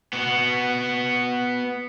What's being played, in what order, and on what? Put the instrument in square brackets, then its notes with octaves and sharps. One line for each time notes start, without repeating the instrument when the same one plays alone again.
[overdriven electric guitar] B3 F#4